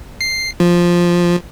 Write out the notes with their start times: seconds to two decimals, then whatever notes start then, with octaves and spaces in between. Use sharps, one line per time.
0.21 C7
0.60 F3